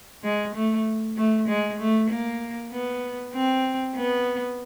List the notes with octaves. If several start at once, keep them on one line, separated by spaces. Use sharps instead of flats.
G#3
A3
A3
G#3
A3
A#3
B3
C4
B3